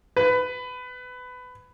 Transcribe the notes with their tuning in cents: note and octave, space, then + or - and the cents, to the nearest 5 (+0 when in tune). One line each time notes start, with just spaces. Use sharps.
B4 +20